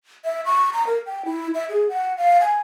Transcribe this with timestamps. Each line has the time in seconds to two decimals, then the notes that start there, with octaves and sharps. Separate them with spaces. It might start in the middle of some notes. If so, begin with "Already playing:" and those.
0.25 E5
0.46 C#6
0.73 A#5
0.87 A#4
1.06 G5
1.25 E4
1.54 E5
1.69 G#4
1.89 F#5
2.17 F5
2.41 G#5